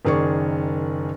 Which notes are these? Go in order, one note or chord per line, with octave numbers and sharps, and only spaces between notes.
F#1 D#3 G#4 D5 C#6